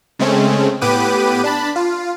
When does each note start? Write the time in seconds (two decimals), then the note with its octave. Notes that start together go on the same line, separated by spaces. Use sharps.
0.19 C#3 G#3 A3 C4 C#4
0.81 A2 B3 G4 B4 D6 D#7
1.44 D4 A5 B5
1.76 F4